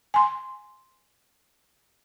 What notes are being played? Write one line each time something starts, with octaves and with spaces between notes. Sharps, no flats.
G#5 C6